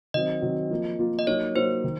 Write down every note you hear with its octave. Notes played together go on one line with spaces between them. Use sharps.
D#3 F#3 C4 D#5
D#3 F#3 C4
F3 A#3 F4
F3 A#3 F4
D#5
F#3 A#3 D#4 C#5
F#3 A#3 D#4 C5
D#3